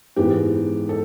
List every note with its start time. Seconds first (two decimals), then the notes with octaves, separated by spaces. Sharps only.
0.16 G#2 E3 G#3 B3 G4
0.89 A4